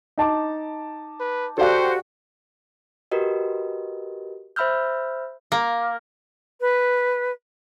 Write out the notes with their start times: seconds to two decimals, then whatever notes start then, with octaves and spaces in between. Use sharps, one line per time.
0.18 D#4 A5 D6
1.20 B4
1.58 F#4 G4 A4 C5 D5 F5
3.11 F#4 G4 A#4 B4 D#5
4.56 C5 E5 B5 E6 F6 G6
5.52 A#3
6.60 B4